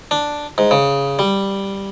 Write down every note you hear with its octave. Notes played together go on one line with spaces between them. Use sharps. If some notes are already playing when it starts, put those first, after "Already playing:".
D4
G#2
C#3
G3